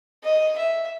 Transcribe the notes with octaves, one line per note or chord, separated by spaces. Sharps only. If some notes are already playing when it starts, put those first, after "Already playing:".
D#5
E5